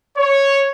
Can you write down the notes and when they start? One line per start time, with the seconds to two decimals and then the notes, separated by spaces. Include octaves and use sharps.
0.16 C#5